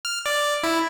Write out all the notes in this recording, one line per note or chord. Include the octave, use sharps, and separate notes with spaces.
F6
D5
E4